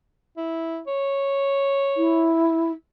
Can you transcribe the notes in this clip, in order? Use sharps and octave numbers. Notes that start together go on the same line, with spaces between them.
E4
C#5
E4